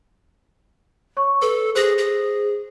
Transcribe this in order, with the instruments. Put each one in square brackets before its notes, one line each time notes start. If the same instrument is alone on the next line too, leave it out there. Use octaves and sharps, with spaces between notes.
[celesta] C#5 C#6
[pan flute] A4 [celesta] B4
[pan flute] G#4 [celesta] C5 A#6
[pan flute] G#4